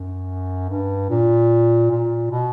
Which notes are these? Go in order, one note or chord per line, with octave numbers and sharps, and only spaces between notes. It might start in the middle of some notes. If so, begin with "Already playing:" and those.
Already playing: F#2
G2
A#2
A#2
B2